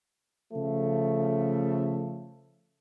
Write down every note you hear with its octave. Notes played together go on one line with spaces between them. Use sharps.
C#3 F3 A3